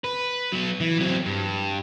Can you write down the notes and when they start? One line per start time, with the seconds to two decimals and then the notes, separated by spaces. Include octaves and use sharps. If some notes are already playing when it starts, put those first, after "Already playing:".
0.04 B4
0.52 F#3 B3
0.80 E3
0.99 F#3 C4
1.26 G2